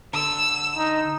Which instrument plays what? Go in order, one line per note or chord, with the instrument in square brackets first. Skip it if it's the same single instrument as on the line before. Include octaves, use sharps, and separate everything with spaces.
[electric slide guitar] D3 [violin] E6
[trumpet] D#4